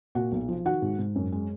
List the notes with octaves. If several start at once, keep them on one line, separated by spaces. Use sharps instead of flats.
A#2 F#4 F#5
B1
F3
D#3 F#4 F#5
G#2
G#2
F#2
G#3